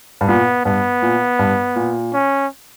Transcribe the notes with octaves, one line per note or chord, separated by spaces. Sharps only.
G2
A#2 B3
G2 B3
A#2
G2
A#2
C#4